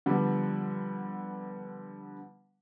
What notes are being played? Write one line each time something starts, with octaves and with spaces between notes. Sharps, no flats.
D3 F3 G3 B3